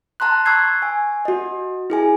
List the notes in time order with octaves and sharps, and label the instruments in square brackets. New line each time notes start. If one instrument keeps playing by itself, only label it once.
[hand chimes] A5 A#5 C6 F#6
C#6 E6 F#6 G#6 C7
G#5
F#4 D#5
E4 G#4 G#5